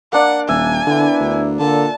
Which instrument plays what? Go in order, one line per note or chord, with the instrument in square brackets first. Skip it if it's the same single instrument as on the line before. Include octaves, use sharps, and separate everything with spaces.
[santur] A#3 D4 D5 [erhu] F#5
[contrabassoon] D#1 [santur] E5 [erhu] G#5
[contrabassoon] D3 [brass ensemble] B3 D4 E4
[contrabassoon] D2
[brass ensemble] A#2 A4 [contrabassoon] D3 [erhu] A5